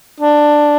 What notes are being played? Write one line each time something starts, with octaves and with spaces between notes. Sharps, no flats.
D4